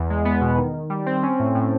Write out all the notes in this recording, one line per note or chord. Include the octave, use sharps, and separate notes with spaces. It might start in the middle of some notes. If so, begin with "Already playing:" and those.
Already playing: E2
G#3
B3
B2
D#3
D#3
G3
C4
C#4
A2
A2